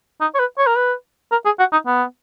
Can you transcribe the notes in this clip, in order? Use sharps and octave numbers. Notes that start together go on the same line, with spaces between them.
D#4
C#5
B4
C#5
A#4
B4
A#4
G#4
F#4
D#4
B3